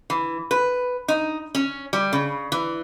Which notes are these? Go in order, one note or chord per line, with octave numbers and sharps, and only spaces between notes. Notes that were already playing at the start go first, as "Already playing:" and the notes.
E3
B4
D#4
C#4
G3
C#3
E3